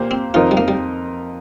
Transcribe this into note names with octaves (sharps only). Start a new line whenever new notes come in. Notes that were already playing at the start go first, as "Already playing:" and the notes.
Already playing: A#2 A#3 G4 C5
C4
F2 F3 D#4 F4 A#4
G3
A#3
G3